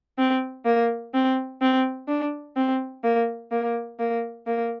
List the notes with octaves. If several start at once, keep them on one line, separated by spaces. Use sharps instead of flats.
C4
A#3
C4
C4
D4
C4
A#3
A#3
A#3
A#3